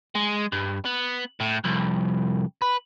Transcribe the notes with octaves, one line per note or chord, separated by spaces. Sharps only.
G#3
G2
B3
A2
C2 F2
B4